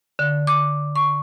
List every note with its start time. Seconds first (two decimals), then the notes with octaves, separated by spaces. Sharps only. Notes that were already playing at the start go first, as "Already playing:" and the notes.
0.19 D3
0.47 D6
0.96 C#6